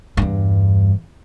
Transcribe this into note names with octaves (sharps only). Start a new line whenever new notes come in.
E2 G2